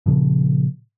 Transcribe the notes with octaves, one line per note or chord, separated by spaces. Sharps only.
A#2 C#3 F3